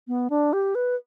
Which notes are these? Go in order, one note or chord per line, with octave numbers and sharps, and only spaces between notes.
B3
D4
G4
B4